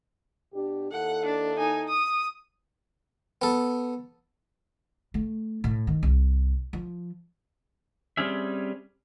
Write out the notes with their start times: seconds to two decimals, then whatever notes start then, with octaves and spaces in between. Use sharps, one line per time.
0.54 B2 D4 G4
0.92 D#2 E4 A4 F#5
1.25 D4
1.57 D#4 G#5
1.88 D#6
3.42 B3 A4
5.14 A3
5.64 A2
5.87 D#3
6.03 C2
6.73 F3
8.17 G3 C4 C#4 G#4 E5